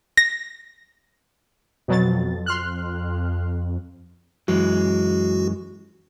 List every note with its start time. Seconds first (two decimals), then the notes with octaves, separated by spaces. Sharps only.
0.17 A#6
1.88 F2 B2 F#3 A6
2.46 C6 F6 F#6
4.48 F#2 E3 G#3 F#4